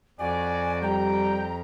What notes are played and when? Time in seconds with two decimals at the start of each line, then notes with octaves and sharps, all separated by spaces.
0.19 F2 F#4 D5 G#5
0.82 G3 G5 A#5